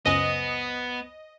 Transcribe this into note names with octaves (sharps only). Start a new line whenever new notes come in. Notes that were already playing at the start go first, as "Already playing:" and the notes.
C#2 F#2 B3 C5 D#5 G#5 D#6